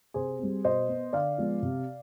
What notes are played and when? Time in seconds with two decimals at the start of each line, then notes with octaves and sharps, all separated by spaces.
0.14 C3 G#4 C5
0.39 G3 C4
0.64 B2 C5 D#5
0.89 B3
1.13 D3 D5 F5
1.38 F3 G#3 B3
1.62 C3